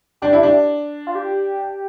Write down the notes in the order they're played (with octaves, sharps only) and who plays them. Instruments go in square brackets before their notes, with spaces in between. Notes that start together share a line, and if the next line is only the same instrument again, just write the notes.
[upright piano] D4 [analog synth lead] G4
[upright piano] E4
D4
[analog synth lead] F4
G4